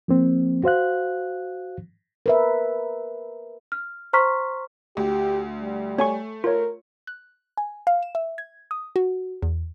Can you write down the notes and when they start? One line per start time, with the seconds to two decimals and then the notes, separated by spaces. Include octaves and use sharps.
0.08 F3 A#3 C4
0.64 F#4 C5 F5 F#6
2.26 A#4 B4 E5
3.72 F6
4.13 C5 A#5 C6 C#6 F6 B6
4.97 D2 G4
5.62 G3
5.98 A3 C#5 G#5 C#6
6.44 F4 A#4 C#5
7.07 F#6
7.57 G#5
7.87 F5
8.03 E7
8.15 E5
8.38 G#6
8.71 D#6
8.96 F#4
9.42 E2